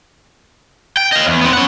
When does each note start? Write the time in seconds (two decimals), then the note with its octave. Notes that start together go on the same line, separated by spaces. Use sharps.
0.97 G5
1.12 D#5 F5
1.26 E2
1.41 B3 C4
1.53 C#4 F#5